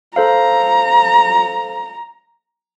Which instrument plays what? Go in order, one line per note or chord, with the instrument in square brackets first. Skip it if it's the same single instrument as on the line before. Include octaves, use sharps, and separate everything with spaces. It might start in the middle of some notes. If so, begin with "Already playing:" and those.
[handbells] A4 C5 F5 [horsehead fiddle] A#5